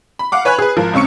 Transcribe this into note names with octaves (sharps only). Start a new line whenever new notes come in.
B5
F5 F#5 D6
B4 C#5 G#5 B5 F#6
G#4 B4
G#1 F3 A#4
C#2 C3 C#4 C#6 C#7